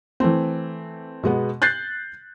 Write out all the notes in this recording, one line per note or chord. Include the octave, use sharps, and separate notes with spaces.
E3 A3 C4
B2 G#3 B3
F#6 G6 A6 C7